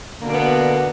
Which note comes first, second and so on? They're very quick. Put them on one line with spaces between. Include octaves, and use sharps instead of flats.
D3 A#3 B2 D4 B3